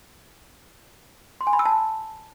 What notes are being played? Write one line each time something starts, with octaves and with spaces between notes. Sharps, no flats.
C6
G#5
B5
E6
A5